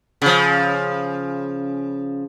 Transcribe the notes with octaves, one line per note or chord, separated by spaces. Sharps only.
C#3 F3